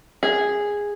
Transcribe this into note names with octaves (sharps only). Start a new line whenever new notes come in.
G#4